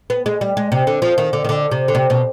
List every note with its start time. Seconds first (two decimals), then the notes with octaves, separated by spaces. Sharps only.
0.10 B3
0.26 G#3
0.41 G3
0.57 G#3
0.72 C3
0.87 D3
1.02 F3
1.18 D#3
1.33 D3
1.44 D#3
1.49 D3
1.71 C3
1.88 D3
1.95 C3
2.10 B2